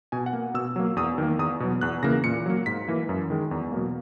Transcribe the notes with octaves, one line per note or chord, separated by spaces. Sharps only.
B2 G#5
F#5
A#3
B2 E6
F#3 A#3
E2 D#6
D#3 A#3
E2 D#6
B2 F#3
E2 F#6
C#3 E3 A#3 A#6
A#2 C#7
F#3 A#3
G#2 B6
E3 A#3
F#2
D#3 G#3
E2
B2 F#3 A#3